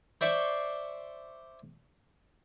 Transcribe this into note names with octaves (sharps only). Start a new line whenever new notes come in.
C5 D5 E5 C6 C#6